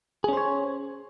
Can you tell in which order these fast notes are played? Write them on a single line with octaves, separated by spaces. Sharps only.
G#4 C#4 C5 C#5